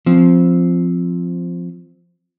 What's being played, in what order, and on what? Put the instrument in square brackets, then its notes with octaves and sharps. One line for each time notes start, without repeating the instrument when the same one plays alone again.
[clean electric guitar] F3 C4